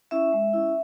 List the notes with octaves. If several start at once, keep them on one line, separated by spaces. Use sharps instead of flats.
C#4 E4 E5
G#3
C#4 E4